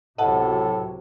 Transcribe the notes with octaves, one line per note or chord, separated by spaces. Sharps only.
C#2 A2 C3 F#3 A4 D#5 F#5 A5